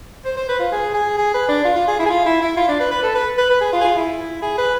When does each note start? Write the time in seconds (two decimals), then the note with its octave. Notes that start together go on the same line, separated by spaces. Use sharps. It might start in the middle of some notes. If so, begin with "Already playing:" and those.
0.25 C5
0.37 C5
0.49 B4
0.59 F4
0.72 G#4
0.94 G#4
1.18 G#4
1.34 B4
1.49 D4
1.65 F4
1.76 F4
1.88 G#4
1.99 E4
2.06 G#4
2.10 F4
2.26 E4
2.42 E4
2.57 F4
2.68 D4
2.80 B4
2.91 B4
3.03 A4
3.15 B4
3.38 B4
3.50 B4
3.61 G#4
3.73 F4
3.81 G#4
3.85 F4
3.96 E4
4.42 G#4
4.58 B4